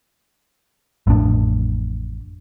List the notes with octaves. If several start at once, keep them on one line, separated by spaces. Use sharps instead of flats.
A1 F2 A2 D4